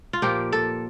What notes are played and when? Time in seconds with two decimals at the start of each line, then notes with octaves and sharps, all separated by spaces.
0.13 F4
0.22 A#2 F3 A#3 G4
0.52 A4